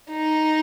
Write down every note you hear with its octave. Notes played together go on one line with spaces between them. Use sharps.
D#4